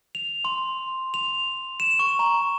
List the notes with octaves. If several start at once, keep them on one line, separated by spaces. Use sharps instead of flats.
F7
C6
F7
E7
C#6
A#5